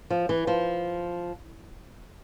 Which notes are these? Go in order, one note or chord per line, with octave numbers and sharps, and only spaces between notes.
F3
E3
F3